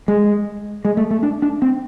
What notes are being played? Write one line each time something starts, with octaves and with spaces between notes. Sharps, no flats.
G#3
G#3
A3
A3
D4
D4
C4